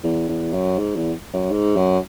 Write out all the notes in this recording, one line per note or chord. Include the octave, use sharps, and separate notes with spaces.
E2
E2
F#2
G#2
E2
F#2
G#2
F#2